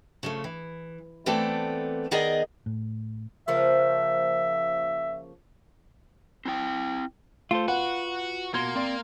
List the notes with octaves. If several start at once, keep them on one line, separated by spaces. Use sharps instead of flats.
C#3 F3 A3
E3
E3 A3 B3 C4 A4 D5
D#3 B3 G#4 D5 D#5 A#5
A2
C#3 F3 A#3 E5
C4 E4 G5
A3 F4 A4 C5
F#4 B4 F#5
B2 A#3 F#4 C6 G#6
C4 D5 C6